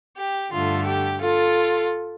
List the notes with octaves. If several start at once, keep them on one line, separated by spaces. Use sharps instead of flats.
G4
G2 D3 A3 F4
G4
F4 A4